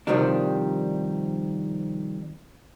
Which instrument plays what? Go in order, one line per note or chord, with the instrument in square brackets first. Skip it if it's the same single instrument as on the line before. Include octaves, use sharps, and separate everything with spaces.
[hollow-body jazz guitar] C3 D#3 F3 G3 D4